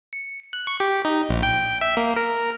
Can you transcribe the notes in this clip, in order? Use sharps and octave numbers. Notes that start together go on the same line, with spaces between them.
C#7
F#6
C#6
G4
D#4
A#1
G5
G5
E5
A#3
A#4